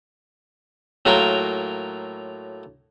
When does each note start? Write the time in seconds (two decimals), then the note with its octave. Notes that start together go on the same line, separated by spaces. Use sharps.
1.05 A2 F#3 A#3 F4 A#4 G5